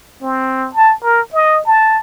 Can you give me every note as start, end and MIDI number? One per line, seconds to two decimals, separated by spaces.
0.22 0.69 60
0.75 0.94 81
1.04 1.21 70
1.33 1.60 75
1.66 2.00 81